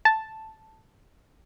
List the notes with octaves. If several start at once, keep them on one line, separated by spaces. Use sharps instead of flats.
A5